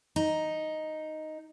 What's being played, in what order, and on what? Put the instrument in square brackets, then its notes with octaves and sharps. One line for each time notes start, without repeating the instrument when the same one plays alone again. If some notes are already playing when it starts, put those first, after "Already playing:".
[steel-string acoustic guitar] D#4